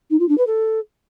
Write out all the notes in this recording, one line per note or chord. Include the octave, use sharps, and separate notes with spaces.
D#4
F4
D4
B4
A4